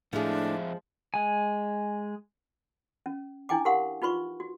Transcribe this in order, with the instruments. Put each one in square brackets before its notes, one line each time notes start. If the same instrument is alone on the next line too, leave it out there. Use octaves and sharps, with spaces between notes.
[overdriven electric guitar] F2 E5 [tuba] A2 [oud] F3 G#3 [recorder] D4
[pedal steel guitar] G#3 G#5
[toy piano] C#4
D4 E4 G5 G#5 D6
G4 A#4 F5 F#5 C6
D#4 F4 B4 C6 C#6
F#4